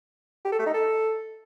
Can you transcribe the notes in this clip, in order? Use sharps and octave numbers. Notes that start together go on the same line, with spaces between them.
G4
A4
A3
D#4
A4